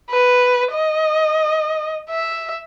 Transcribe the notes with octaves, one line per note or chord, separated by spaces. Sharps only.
B4
D#5
E5